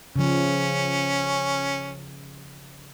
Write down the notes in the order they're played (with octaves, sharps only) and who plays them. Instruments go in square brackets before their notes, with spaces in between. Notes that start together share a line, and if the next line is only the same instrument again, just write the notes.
[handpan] C#3 F3 [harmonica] C#4